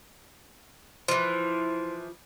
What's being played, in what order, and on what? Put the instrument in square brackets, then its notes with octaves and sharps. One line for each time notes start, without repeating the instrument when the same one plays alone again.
[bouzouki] E3 F3 [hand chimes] C5 C6